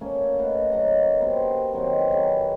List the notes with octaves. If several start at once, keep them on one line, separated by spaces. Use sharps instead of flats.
A3 A#3 C#4
B4 D#5 F5 F#5
F#3 A#3 D#5 F#5
A#3 B3 G4 C5
B2 D#3 F#3 C4
F#3 B3 G4 G#4